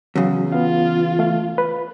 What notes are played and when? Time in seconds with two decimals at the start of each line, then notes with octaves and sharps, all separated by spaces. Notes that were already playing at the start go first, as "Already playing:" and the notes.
0.16 E2 C#3 F#3
0.52 B3 F4 F5
1.19 A3 F5
1.58 B4